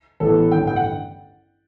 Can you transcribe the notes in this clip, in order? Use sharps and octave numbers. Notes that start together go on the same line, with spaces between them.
A1 A2 E3 B3 A4
A1 G2 D3 G5
G5
F#5